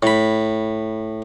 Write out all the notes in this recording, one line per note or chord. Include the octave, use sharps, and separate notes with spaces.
A2 B5